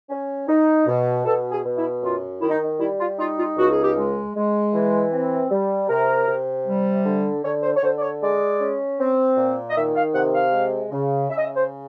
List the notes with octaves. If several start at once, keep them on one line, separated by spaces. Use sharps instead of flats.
C#4
D#4
B2
B2 A4
G#4
B2
E4
F#2 F4
D#3 E4
D#4
D#4
G3 E4
F4
D#4 F4
F4
C#2 F#4
G#4
G4
G#3
G#3
E3
C4
G3
C3 A#4
C3
G3
D3
D3 C#5
C5
C#5
D3 C5
D5
C#5
G#3 D5
C#4
C4
A#2
D#5
D#3 E5
F5
C3 F#5
F5
G#3
C#3
C#3 E5
D#5
E5
C5